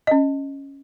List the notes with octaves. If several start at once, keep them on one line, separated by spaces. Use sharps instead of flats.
C#4 D#5